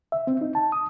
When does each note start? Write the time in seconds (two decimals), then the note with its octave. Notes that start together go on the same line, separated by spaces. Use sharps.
0.12 E5
0.27 C4
0.41 D#4
0.55 A5
0.72 D#6